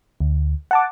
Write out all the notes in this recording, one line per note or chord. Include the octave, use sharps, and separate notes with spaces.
D2
F#5 A5 D6